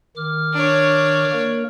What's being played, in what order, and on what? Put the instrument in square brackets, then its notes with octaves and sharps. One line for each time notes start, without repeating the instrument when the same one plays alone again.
[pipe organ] D#3 D6 F6
[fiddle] D4 C#5
[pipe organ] A#3 A#4